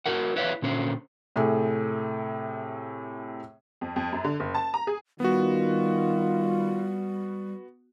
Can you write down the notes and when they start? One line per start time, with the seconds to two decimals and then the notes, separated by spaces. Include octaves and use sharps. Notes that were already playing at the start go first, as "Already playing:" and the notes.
0.06 E4 F#4 A#4 F#5
0.36 E4 B4 C#5 D5 E5 F5
0.62 A#2 D3 C#4 C5
1.36 A2 C3 A3 G#4
3.81 F2
3.96 F2
4.12 F#2
4.24 D3
4.40 F#1
4.55 A5
4.74 A#5
4.87 G#4
5.20 D#3 G3 B3 F4 F#4